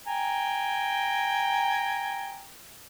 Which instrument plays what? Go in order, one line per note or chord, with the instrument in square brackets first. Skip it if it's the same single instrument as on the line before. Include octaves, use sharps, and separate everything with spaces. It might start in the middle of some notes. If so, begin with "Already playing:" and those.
[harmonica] G5 G#5 A#5